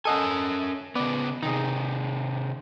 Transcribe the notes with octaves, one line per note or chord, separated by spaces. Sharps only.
C#4 A4 A#4 D#5 F#5 G#5
C#3 B3 B4 D5
C3 D#3 D#4 G#4